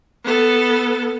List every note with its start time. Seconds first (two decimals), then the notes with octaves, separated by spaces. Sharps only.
0.24 B3 A4